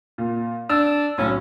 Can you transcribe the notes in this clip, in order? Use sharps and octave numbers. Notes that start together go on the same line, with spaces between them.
A#2
D4 E6
B1 A2 C#4